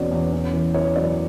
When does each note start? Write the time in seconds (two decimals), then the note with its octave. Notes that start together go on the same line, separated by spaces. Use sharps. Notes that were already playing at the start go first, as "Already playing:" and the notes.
Already playing: E2 B2 C#4 D5
0.11 E2
0.32 C#4
0.53 E3
0.74 E3 C#5
0.96 F#2 D5